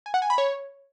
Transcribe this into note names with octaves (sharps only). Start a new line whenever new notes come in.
G#5
F#5
G#5
B5
C#5